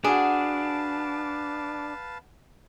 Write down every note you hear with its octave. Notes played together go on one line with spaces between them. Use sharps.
D4 F#4 G#4 B4 F5 F#5 A5